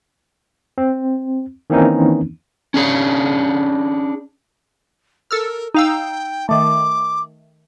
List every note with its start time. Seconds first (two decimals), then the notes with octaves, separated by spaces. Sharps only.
0.78 C4
1.70 D#3 E3 A#3 C4 C#4 D#4
2.74 C#4 D4 G#4 C#5
5.31 A4 A#4 E6 F6
5.74 D#4 F5 G5 E6
6.49 D#3 A3 D6